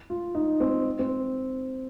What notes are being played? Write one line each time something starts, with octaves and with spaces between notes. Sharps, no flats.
F4
D#4
C4
C4